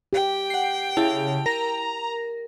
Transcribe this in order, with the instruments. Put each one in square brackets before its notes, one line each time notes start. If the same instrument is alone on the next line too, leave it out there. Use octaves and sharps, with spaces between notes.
[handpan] G4 [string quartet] G5
[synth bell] F#5 C7
[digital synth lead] C#3 [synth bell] E4 A5 F7
[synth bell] A#4 A#6 [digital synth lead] A#5